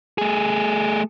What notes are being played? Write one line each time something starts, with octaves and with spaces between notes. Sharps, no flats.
A3 G#4